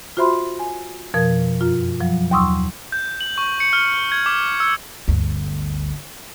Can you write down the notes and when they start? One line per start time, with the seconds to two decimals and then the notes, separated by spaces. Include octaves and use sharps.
0.17 F4 F#4 C5 E5 B5 C6
0.59 G#5
1.14 F2 B2 F3 A#4 G#6
1.61 F#2 F4
2.00 F3 F#3
2.31 D#2 F#3 C6 C#6 D#6 E6
2.92 G6
3.21 F#7
3.38 C#6
3.60 C#7
3.73 F6
4.12 G#6
4.26 D6
4.60 E6
5.08 G1 D2